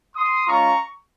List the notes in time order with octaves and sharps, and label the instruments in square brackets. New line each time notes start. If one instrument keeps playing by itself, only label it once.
[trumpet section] C6 D#6
G#3 C#4 F4 A#5 C#6